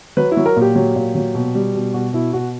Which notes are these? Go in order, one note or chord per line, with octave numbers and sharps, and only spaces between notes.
F#3 B4
E4
F#3
A#4
A#2
G4
F#3
A#2
F#3
B2
G3
B2
B2 F#4
B2 E4
B2 F#4